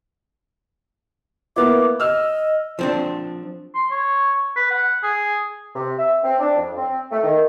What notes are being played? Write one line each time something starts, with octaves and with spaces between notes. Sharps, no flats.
A#3 B3 E4 D6
D#5 E6 F6
F3 C4 D4
C6
C#5
B4
F#5
G#4
C3
E5
C4
D4
F2
C4
A3
D#3